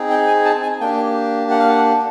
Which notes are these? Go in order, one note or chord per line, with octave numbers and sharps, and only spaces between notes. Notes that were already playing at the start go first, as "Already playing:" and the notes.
Already playing: C4 D#4 G#4
G5
G#5
A5
G#5
A#3 D4 G4 G5
F#5
F5
F#5